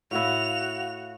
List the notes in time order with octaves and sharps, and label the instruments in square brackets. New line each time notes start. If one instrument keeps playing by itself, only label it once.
[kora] A2 E4 [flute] F#4 [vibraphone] F5 [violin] F7